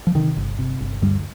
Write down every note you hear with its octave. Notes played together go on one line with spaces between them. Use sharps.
F3
C3 D#3
G1
C3
G1
D2 G2 G3